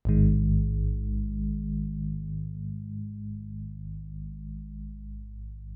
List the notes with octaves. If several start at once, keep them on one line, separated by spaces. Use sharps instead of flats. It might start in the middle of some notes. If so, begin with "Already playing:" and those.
A1 G#2 D#3 G#3